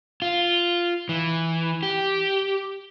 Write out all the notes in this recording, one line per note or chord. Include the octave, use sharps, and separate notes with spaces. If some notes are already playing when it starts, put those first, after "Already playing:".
F4
E3
G4